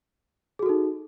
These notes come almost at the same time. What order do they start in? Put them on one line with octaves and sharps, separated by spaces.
G#4 F#4 A4 D#4